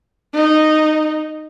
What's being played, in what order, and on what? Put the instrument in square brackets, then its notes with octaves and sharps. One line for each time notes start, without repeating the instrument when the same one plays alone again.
[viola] D#4